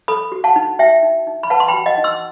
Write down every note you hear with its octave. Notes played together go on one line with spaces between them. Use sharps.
A4 B5 D#6
F#4
F#5 A5
D#4
F#4 E5 G5
D#4
D#4
B5
B4 F#5 A5
C6
G5 B5
F#4
D#5 F#5
D#4
C6 E6